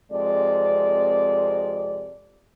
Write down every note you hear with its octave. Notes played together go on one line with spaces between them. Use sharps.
F2 C3 G#3 D5